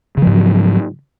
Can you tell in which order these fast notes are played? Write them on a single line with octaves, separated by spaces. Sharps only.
C#3 F3 G#2 F#3